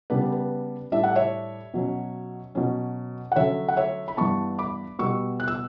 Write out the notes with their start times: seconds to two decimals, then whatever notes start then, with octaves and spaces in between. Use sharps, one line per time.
0.10 C#3 G3 B3 D4 B4
0.32 B4
0.92 A2 G3 D4 E5
1.04 F#5
1.15 C#5 E5
1.74 B2 F#3 C#4
2.55 B2 F#3 C#4
3.32 F#5
3.36 D3 F#3 C#4 C#5 E5
3.68 F#5
3.77 C#5 E5
4.08 B5
4.17 G2 E3 B3 A5 C#6
4.58 B5 D6
4.99 B2 G3 B3 C#6 E6
5.40 F#6
5.48 E6